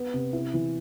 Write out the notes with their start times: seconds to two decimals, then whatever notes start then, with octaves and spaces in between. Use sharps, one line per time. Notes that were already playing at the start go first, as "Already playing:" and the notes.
Already playing: B3
0.14 C3
0.33 E4
0.54 E3